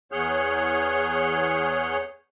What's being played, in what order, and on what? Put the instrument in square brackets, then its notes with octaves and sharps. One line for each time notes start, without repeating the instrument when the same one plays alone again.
[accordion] E2 G#4 C#5 F#5 F6 G6